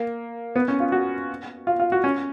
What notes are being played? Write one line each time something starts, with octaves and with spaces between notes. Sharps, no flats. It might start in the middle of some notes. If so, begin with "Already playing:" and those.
Already playing: A#3
B3
C#4
F4
F#4
F4
F4
F#4
C#4